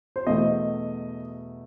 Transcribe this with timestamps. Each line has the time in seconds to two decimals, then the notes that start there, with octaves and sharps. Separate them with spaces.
0.16 C5
0.26 E2 B2 A3 D#5